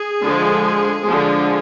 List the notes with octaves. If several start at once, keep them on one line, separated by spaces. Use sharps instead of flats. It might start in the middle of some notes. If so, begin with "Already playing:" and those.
Already playing: G#4
D3 F3 G#3
D3 F3 G#3